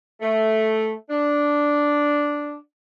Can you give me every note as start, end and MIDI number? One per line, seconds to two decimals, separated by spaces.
0.21 0.92 57
1.10 2.55 62